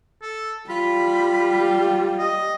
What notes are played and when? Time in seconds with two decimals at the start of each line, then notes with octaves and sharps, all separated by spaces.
0.22 A4
0.69 G3 F4 B5
2.18 D#5